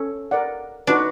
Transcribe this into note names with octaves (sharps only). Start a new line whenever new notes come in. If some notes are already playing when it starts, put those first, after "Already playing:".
Already playing: C#4 A4 C#5
A#4 D5 F#5
D4 D#4 F#4 B4